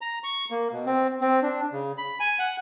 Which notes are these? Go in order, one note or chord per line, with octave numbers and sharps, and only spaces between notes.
A#5
C#6
A#3
B2
C4
C4
D4
C#3
B5
G#5
F#5